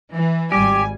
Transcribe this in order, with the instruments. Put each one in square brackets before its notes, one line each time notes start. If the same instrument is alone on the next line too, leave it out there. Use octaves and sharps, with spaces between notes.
[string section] E3
[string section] G#1 G3 G#5 [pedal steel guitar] G4